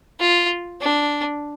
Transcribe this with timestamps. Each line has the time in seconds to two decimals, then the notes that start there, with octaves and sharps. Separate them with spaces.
0.20 F4
0.81 D4